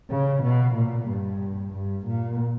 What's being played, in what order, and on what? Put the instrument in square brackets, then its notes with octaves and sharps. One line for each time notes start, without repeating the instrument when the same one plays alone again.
[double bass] C#3
B2
A#2
G2
G2
A#2